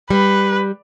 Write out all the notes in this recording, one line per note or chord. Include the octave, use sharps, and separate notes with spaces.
G3 B4